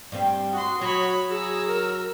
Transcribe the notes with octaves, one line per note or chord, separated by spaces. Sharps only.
G2 G3 C4
F#4 C6 D#6
F#3 F#4 C#5 B5
F#3 G#4 A#5 E6
A#4